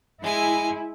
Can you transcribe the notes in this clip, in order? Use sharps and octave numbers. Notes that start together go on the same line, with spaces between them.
G#3 E4 G#5